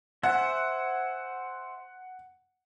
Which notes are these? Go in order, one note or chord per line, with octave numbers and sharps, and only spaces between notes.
C5 E5 F#5 G#5